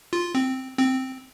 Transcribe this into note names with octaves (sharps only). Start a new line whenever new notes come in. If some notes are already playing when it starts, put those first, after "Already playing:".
F4
C4
C4